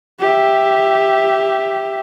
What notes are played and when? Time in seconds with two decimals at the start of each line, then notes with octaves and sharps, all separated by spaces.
0.19 G4 E5